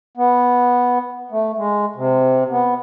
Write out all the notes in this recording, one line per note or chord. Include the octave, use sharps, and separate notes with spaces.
B3
A3
G#3
C3
B3